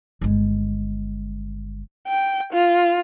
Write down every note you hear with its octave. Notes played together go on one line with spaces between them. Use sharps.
G1 G#3
G5
F4